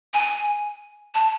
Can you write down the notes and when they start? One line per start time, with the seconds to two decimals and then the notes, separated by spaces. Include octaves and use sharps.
0.14 G#5
1.15 A5